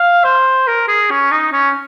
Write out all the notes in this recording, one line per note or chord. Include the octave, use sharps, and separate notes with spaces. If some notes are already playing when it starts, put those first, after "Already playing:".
Already playing: F5
C5
A#4
G#4
C#4
D#4
C#4